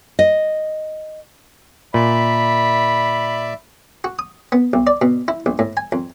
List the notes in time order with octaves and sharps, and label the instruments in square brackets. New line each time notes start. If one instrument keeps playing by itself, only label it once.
[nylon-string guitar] D#5
[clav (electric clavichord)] A#2 [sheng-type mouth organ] D5 E5 [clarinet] B5
[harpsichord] F#4
D#6
B3
B1
D5
B2
E4
A#1
A2
G#5
F2